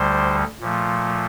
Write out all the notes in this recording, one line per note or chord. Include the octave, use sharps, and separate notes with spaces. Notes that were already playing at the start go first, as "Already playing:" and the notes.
Already playing: D2 D3 G3 C5
A#2 F3 A3